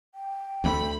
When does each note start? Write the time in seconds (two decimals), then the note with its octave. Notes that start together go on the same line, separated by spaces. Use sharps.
0.14 G5
0.64 D2 G#3 A3 B5